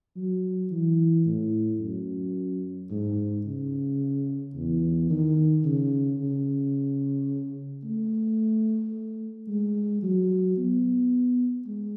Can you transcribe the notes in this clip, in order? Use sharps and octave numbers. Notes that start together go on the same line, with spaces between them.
F#3
E3
A2
F#2
G#2
C#3
E2
D#3
C#3
C#3
A3
G#3
F#3
B3
G#3